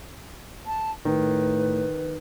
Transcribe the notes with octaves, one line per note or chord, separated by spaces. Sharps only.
A5
A2 D#3 B4